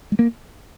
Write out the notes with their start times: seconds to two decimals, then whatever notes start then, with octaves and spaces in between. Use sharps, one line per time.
0.12 G#3
0.19 A#3